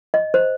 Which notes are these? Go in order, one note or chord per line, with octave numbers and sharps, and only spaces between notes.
D#5
C5